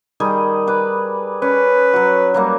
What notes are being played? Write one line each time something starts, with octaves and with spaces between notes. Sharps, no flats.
D#3 G3 G#4
B4 D6
C#4 B4
F#3 F#4
F#3 G3 A#3